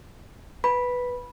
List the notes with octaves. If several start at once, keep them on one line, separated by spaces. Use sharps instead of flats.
B4 B5